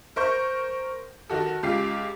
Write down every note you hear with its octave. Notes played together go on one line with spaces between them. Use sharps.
A#4 C5 C#6 G6
D#3 F#4 A4
C#2 F4 G4 C7